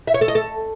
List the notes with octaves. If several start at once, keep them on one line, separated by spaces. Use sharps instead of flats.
E5
C#5
A4
D#5
A4